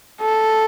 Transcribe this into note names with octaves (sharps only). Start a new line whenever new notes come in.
A4